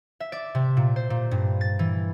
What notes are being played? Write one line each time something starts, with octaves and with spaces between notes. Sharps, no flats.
E5
D5
C3
A#2
C5
A#2
G2
A6
E3